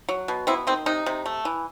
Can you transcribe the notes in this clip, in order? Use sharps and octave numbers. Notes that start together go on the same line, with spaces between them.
F#3
B2
B3 C4 E4
D#3 C4
C3 D#4
C3
A3
E3